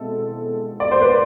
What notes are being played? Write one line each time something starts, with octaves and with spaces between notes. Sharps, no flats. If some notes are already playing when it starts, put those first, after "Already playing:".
Already playing: B2 G#3 C4 E4 A4
D5
C5
B4